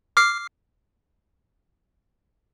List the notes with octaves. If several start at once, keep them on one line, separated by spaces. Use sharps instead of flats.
D6 F6 C7